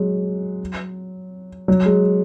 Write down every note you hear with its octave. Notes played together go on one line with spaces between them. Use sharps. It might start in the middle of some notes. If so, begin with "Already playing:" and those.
Already playing: F#3 G#3
F#3
G#3